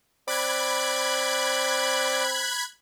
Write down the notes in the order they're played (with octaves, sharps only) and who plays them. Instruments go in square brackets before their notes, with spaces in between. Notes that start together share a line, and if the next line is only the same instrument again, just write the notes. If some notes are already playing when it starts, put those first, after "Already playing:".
[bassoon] C4 [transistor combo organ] D5 [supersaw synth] B5 F#6 G#6